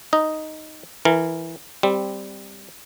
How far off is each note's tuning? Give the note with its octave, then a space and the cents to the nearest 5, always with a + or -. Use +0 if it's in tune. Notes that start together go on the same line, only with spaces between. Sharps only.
D#4 +0 D#5 +0
E3 +0 A#4 -15
G3 +10 C4 +0